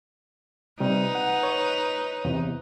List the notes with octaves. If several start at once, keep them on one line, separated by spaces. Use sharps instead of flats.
C3 G3 D#4 B4
F#5
C#5
E2 C3